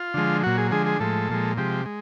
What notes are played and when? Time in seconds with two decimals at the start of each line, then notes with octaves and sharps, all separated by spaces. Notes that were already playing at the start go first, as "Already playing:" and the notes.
Already playing: F4
0.14 D3 F3 G#3
0.43 A#2 F#3 F#4
0.58 G#4
0.71 D3 F3 G#3 G#4
0.86 G#4
1.00 A2 F3 G#3 A4
1.29 A#2 F3 G#3
1.57 C3 F3 G#3 G4
1.86 G#3